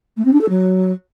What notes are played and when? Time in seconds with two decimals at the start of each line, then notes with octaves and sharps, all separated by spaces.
0.16 A3
0.24 C4
0.33 D4
0.41 A4
0.49 F#3